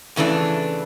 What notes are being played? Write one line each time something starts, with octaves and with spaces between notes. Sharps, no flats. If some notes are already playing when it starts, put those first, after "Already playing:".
F2 C#3 E3 A3 D4